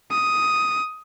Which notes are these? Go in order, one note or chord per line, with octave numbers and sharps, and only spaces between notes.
D#6